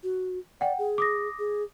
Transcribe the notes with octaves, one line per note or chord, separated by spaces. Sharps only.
F#4
D5 F#5 G5
G#4
D6 D#6 A#6
G#4